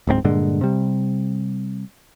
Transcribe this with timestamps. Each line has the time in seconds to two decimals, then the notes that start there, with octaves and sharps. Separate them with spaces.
0.07 D1 G#2 A#3 C4
0.24 G2 A#2 D3 G#3
0.61 C3 G3